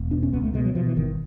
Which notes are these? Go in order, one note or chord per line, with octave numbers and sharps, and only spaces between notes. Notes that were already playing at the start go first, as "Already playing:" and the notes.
Already playing: E1
B2 D4
C#4
C#2 B3
A3
B2 G#3
F#3
B2 F3
E3
G1 D#3